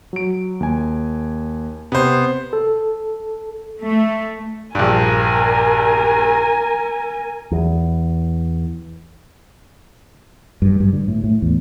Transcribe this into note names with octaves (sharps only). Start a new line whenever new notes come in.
F#3 D7
D#2 G#5
C3 B3 C5
A4
A3
A#1 G2 A#4 G#5
E2
G2
G2
D3
A2
A2
E2